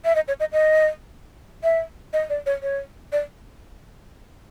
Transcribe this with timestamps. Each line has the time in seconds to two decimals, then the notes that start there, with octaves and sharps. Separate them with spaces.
0.05 E5
0.15 D#5
0.28 C#5
0.40 D#5
0.53 D#5
1.64 E5
2.13 D#5
2.30 D5
2.46 C#5
2.63 C#5
3.12 D5